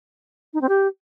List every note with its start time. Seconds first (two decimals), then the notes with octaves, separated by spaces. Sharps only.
0.54 D#4
0.61 C4
0.69 G4